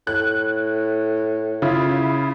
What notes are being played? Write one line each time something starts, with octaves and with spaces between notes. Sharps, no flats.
A2 F#6
C#3 E4 F4